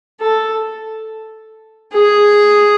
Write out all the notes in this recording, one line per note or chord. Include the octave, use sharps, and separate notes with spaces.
A4
G#4